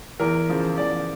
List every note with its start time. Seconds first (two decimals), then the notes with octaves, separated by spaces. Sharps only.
0.20 E2 A#4
0.49 C#3 F3
0.78 E2 D5